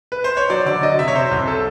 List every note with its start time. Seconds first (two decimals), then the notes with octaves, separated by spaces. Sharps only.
0.12 B4
0.24 C5
0.37 C#5
0.50 F#3 D5
0.66 D3 D5
0.82 F#3 D#5
0.99 C3 E5
1.08 C#5
1.15 C3 C5
1.31 C2
1.48 A4